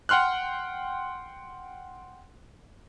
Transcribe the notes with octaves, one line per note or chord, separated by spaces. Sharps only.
F#5 G5 C6 F6 F#6